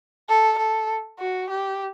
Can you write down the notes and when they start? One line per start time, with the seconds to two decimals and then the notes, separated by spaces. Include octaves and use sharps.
0.29 A4
0.59 A4
1.19 F#4
1.50 G4